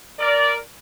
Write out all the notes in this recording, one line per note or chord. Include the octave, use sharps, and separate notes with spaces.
A#4 D5